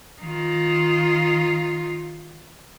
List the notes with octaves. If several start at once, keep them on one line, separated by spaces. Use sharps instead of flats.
D#3 F4